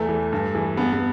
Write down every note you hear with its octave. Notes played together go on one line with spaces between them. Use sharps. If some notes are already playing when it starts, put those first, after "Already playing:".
Already playing: E2 A3
E3
G2
E3
G2 B3
B3